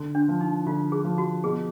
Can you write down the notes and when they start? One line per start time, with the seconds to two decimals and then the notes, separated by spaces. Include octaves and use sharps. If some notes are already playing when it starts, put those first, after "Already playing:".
Already playing: D3
0.15 D4
0.28 F3
0.41 D#4
0.66 D3 F4
0.92 G#4
1.04 F3
1.18 F#4
1.44 B2 G#4